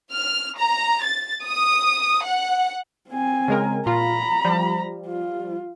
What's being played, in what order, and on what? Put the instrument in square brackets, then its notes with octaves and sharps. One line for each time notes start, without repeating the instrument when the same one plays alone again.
[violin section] F6
A#5
A6
D#6
F#5
[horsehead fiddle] C4 G#5
[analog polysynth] C#3 G#3 A#4
[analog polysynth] A#2 F4 [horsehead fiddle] A#5 B5
[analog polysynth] F3 G3
[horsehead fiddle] F4